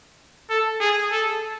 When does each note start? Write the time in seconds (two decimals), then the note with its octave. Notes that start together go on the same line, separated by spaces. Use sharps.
0.50 A4
0.80 G#4
1.12 A4